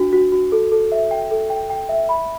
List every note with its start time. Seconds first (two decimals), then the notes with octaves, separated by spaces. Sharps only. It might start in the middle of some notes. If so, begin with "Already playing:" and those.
Already playing: D4 F#4
0.13 F#4
0.32 F#4
0.52 A4
0.72 A4
0.92 E5
1.11 G5
1.31 A4
1.50 G5
1.70 G5
1.89 E5
2.09 B5